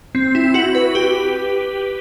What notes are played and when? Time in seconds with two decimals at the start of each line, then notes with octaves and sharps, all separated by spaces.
0.15 C4
0.35 E4
0.54 F#4
0.75 B4
0.95 G4